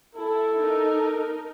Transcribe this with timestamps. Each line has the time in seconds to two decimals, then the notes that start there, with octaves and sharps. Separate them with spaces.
0.15 E4 A4
0.58 D#4 A#4